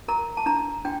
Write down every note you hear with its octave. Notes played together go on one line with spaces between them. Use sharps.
A#4 A#5
A5
D4 A#5
D4 G5